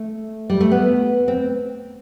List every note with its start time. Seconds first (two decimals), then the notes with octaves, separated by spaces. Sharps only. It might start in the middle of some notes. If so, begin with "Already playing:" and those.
Already playing: A3
0.50 G3
0.61 A3
0.71 B3
1.28 C4